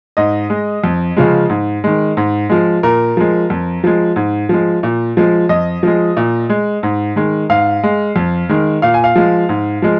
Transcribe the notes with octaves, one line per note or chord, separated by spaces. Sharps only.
G#2 D#5
G#3
F2
C#3 F3 G#3
G#2
D#3 G#3
G#2
F3 G#3
A#2 A#4
F3 G#3
F2
F3 G#3
G#2
F3 G#3
A#2
F3 G#3
F2 D#5
F3 G#3
A#2
G#3
G#2
D#3 G#3
G#2 F5
G#3
F2
D#3 G#3
A#2 F5
G#5
F5
F3 G#3
G#2
F3 G#3